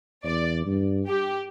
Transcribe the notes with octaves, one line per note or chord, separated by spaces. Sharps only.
E2 D5
G2
G4